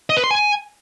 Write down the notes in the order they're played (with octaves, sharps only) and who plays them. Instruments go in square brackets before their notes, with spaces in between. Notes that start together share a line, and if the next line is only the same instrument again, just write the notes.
[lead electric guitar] D#5
B4
C6
G#5